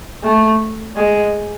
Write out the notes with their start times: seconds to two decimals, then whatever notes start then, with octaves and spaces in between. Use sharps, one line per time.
0.23 A3
0.96 G#3